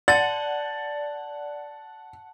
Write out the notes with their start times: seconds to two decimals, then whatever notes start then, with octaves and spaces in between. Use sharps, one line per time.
0.08 D5 F#5 A5 A6 F#7